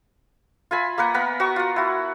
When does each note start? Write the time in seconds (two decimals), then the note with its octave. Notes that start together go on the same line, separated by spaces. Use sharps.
0.71 F4 E5 G#5 B5
0.98 A#3 A#4 B4 F#5
1.14 B3 A#4 B5
1.40 F#4 C#6 D#6
1.56 F4 F#5
1.76 E4 F#4